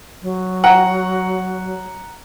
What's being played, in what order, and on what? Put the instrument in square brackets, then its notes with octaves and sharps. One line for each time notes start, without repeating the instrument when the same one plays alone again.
[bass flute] F#3
[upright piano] F#5 A#5